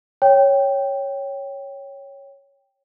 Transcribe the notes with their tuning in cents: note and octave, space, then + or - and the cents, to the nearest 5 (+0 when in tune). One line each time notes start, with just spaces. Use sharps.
C#5 +0 G5 +0